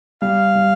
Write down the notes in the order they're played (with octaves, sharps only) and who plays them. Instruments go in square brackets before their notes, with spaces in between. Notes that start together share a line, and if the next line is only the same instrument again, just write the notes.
[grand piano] G3 [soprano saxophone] F5
[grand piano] G3